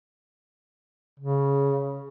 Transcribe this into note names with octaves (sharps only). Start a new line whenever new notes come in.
C#3